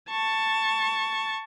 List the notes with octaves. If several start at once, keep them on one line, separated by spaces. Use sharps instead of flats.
A5 C#6